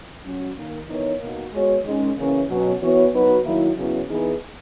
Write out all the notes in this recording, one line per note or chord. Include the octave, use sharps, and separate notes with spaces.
F#3 C#4 F#4
D#3 A#3 D#4
E3 B3 D#4 A#4 C#5
B2 A#3 D#4 F#4
G#3 B3 F#4 C#5
D#3 G#3 C#4
C#3 E3 A#3 C#4
B2 F#3 C#4
E3 B3 F#4 C#5
F#3 B3 D#4 F#4 B4
D#3 F#3 A#3 E4
C#3 F#3 B3 E4
E3 B3 D#4 G#4 B4